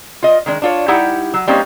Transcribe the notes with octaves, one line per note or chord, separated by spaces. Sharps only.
F4 D#5
D#3 G#3 D4
D4 F4 C#5
G3 D#4 E4 G4 F#5
F#3
G3 A#3 C4 C#4 D#4